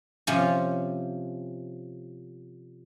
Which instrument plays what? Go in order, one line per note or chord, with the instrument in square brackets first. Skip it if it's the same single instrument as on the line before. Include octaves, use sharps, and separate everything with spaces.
[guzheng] C3 F3 C#4